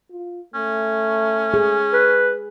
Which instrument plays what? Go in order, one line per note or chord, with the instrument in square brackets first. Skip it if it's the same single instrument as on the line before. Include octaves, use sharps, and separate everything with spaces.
[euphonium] F4
[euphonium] A3 [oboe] C#4
[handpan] G#4
[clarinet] B4